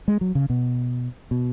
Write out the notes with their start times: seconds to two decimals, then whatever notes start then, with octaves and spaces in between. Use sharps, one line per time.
0.08 G#3
0.21 F#3
0.35 C#3
0.50 B2
1.31 B2